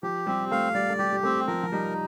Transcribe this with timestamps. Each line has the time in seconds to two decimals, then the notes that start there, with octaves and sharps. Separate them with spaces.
0.03 F3 G4
0.27 G3 C4
0.51 A3 F5
0.75 G3 D5
0.90 A3
0.99 G3 G4
1.12 G3
1.23 A3 C4
1.47 F3 A#4
1.63 F3
1.72 G3 D#4